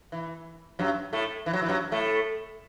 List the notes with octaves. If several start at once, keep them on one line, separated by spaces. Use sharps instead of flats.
E3
F#2 F#3
A2 A3
E3
F#3
E3
F#2 F#3
A2 A3